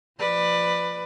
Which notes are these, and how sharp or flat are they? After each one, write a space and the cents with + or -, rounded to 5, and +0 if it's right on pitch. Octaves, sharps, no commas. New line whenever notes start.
F3 -10 B4 +0 D5 +20